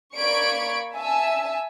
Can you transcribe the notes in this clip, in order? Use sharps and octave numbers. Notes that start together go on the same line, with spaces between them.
A#3 D5 B5 C#6 G#6 D7
E5 G#5 A5 E6